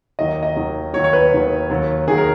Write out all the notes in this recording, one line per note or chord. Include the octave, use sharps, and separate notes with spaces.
D#2 D#3 F#3 D#5
D#5
D#2 D#3 F#3
D#2 D#3 F#3 C#5
C#5
B4
D#2 D#3 F#3
D#2 D#3 F#3
D#2 D#3 F#3 G#4
A#4